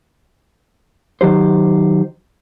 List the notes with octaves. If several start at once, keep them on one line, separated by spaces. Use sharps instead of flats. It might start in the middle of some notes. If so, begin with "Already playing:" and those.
D#3 F#3 G4 C5